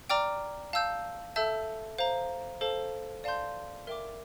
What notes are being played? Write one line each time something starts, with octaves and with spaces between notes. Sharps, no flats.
D5 G5 A#5 D6 F6
F5 A5 E6 G6
A4 E5 A5 E6 G6
C5 F5 A#5
A4 C5 F5 A5
D5 F5 A5 C6 G6
A#4 E5 G5 D6